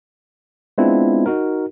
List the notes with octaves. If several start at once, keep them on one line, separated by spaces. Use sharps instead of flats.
G#3 B3 C4 D4 E4 F4
D#4 F#4 A#4